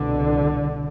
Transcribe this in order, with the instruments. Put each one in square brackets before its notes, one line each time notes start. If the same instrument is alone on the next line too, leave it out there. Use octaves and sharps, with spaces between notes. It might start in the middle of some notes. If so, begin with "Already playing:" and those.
Already playing: [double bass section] C2 B2 D3